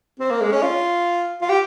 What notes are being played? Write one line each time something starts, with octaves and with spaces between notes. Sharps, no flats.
C4
A#3
G#3
C#4
F4
F4
G4